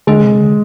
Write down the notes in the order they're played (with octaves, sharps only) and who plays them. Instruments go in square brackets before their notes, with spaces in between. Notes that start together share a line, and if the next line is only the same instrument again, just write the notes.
[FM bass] D3 [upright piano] G#3
[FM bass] C3
D3